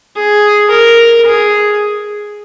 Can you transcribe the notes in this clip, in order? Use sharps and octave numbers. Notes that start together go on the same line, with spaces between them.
G#4
A#4
G#4